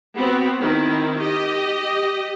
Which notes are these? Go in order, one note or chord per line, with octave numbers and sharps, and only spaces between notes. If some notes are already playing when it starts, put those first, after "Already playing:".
B3 C4 F#4
D#3 C4 E4
G4 D#5